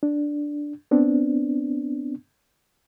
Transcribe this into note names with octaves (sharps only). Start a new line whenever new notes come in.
D4
B3 C4 D4